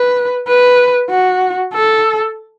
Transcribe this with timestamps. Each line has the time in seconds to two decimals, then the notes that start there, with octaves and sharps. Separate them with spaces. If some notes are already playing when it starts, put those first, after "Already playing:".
Already playing: B4
0.48 B4
1.11 F#4
1.74 A4